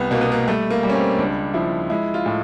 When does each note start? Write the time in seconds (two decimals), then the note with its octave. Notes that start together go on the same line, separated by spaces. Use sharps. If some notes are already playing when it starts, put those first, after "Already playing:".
Already playing: C2 B3
0.11 B2 A#3
0.21 B3
0.32 A#3
0.47 G3 A3
0.70 A#3
0.83 G3
0.90 C#4
0.95 C4
1.19 C#2 D4
1.54 F3 E4
1.90 G#3 E4
2.14 F4
2.26 A2